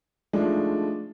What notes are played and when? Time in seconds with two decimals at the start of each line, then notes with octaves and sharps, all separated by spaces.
0.33 F3 G#3 A3 D4 D#4 F4